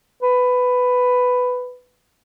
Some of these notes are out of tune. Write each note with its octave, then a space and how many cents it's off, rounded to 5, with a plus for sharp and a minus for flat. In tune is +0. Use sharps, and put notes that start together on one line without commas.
B4 +10